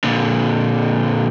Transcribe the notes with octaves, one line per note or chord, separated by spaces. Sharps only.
A#2 D3